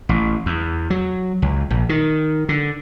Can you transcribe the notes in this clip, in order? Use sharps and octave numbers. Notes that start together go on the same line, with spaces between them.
A1
E2
F#3
C#2
A#1
D#3
D3